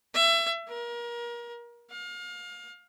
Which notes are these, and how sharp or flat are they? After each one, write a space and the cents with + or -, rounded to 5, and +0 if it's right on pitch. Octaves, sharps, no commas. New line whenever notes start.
E5 +25
A#4 +30
F5 +30